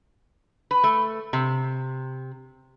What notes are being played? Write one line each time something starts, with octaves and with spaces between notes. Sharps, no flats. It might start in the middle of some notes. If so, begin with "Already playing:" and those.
B4
A3
C3